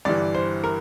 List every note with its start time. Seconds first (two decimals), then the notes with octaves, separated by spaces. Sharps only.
0.05 G1 G2 E3 G3 D5
0.34 C5
0.64 A#4